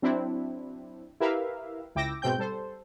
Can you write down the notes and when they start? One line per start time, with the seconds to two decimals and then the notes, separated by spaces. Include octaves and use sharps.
0.02 F#3 C4 D4 E4
1.20 E4 G4 A#4 B4 E5 F5
1.95 C#2 E4 G5 D6 E6 A#6
2.22 G#2 B2 C4 G5 G6
2.38 G3 A4 C5